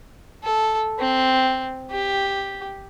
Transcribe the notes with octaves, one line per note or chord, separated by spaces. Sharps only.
A4
C4
G4